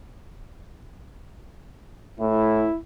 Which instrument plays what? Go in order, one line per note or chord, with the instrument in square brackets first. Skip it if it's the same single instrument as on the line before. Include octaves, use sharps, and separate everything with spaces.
[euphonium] A2 [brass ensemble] E4